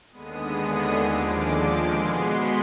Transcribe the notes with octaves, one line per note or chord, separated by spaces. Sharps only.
D#2 D3 G#3 B3 D#6
D#2 D3 F3 G#3 D6
B2 G#3 B3 C6
B5